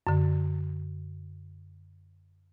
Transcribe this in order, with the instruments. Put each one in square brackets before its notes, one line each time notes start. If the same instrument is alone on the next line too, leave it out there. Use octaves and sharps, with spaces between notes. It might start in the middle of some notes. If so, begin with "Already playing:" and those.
[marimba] F#2 D3